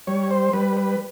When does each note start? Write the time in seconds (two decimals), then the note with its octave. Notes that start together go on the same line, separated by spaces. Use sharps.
0.07 G3 C#5
0.31 C5
0.53 G3 B4
0.77 B4